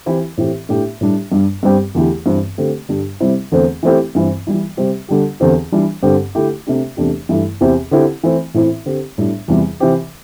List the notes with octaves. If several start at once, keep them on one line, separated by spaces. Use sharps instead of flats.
E3 C4 E4 G4
A2 E3 C4 G4
A2 A3 D4 G4
A2 G3 D4 G4
G2 G3 D4
G2 G3 C4 G4
E2 D3 A3 E4 G4
G2 E3 C4
D3 A3 C4 G4
G2 D3 G3 D4 G4
C3 G3 C4 E4
E2 D3 A3 C4
E3 A3 C4 E4 G4
G2 E3 C4
E3 G3 E4
C3 G3 C4 G4
D3 G3 D4 G4
E2 D3 C4 G4
E3 G3 D4
G2 D3 C4 G4
D3 A3 E4 G4
C3 A3 D4 G4
E2 C3 A3 D4 G4
G2 E3 A3 E4
E2 C3 E3 C4 G4
D3 C4 E4 G4
E3 A3 C4
A2 E3 C4 E4
D3 C4 G4
A2 G3 D4
E2 C3 E3 G3
C3 E3 C4 G4